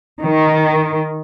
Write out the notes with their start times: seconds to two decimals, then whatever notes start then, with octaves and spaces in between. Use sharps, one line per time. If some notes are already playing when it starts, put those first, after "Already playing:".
0.22 D#3